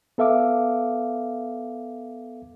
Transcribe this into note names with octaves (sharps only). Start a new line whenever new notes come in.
B3 A4 E5 F5 D6